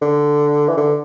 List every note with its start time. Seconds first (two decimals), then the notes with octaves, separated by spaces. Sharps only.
0.01 D3
0.69 E3
0.77 D3